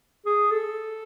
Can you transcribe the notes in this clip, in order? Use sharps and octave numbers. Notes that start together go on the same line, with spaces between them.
G#4
A4